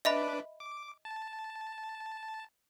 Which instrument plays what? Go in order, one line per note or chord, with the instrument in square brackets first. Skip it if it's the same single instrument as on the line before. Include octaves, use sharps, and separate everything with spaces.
[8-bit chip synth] D4 B4 D6 [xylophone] D#5 E5 B5
[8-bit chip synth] D6
A5